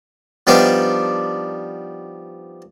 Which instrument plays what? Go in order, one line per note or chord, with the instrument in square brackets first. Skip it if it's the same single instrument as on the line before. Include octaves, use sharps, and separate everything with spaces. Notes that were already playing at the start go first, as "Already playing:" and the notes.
[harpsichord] F3 G3 B3 D4 D#4